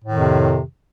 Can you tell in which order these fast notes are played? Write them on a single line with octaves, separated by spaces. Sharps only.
A2 D#3 F2 C3